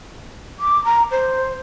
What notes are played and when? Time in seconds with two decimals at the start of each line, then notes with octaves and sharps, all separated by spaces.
0.60 D6
0.85 A#5
1.11 C5